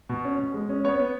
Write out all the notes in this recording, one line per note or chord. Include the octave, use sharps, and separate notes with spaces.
B2
C#4
B2
G#3
C#4
B3 C#5
B3